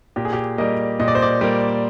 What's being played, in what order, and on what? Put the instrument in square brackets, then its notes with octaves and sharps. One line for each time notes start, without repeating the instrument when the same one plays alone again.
[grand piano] A#2 G4
G#4
G4
G3 A#3 D#5
A#2 D#5
D5
C5
D5
G3 A#3